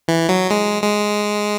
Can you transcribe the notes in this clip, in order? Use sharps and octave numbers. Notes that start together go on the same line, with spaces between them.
E3
F#3
G#3
G#3